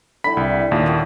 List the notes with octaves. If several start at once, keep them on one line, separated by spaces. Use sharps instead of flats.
D3 G3 E4 B5 B6
C2
D#2 A#2
F4 F#4